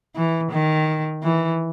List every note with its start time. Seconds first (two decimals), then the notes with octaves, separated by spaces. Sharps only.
0.16 E3
0.52 D#3
1.23 E3